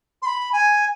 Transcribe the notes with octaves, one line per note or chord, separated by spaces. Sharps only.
C6
B5
G#5